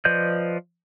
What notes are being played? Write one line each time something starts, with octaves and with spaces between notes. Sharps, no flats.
F3 B4 D5 D#5 G6